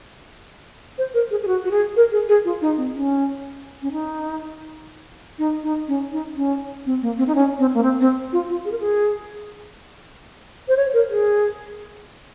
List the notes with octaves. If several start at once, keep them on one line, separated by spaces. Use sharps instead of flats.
C5
A#4
G#4
G#4
F#4
F#4
G#4
A#4
G#4
G#4
F4
D#4
C4
C#4
C#4
D#4
D#4
D#4
C#4
D#4
C#4
C4
A#3
C4
D#4
C#4
C4
A#3
C4
C4
F4
F4
G#4
A#4
G#4
C5
C#5
A#4
G#4